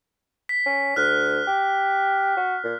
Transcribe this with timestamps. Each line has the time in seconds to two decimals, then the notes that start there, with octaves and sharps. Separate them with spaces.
0.49 B6
0.66 C#4
0.96 D2 F6 F#6
1.47 G4
2.37 F#4
2.64 A#2